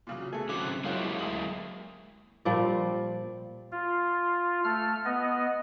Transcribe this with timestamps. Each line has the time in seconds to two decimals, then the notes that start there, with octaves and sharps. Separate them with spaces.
0.07 A#2 C#3 F#3
0.33 B2 A3 G#4 A4
0.49 C#3 F#3 C4 D6 F#6
0.84 F#3 G#3 A#3 E4 F4 G4 C#5
1.19 D2 D#6 F#7
2.45 A#2 F3 G3 D5
3.72 F4
4.64 A3 F6
5.05 B3 D#5